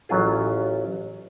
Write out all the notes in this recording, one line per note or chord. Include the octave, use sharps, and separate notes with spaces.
A1 F#3 C#4 F4 G#4